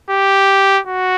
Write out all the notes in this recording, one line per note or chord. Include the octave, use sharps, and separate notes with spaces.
G4
F#4